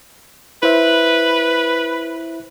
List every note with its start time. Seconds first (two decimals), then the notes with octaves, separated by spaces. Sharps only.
0.63 E4 B4 C5 E5